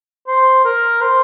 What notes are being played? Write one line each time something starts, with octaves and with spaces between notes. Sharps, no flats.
C5
A#4
C5